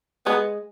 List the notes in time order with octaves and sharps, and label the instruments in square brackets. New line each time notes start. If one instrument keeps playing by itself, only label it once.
[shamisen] G#3 [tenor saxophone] B3